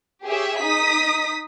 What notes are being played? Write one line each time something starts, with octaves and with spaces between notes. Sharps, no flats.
G4 G#4 C#5 E5
D#4 D#6 B6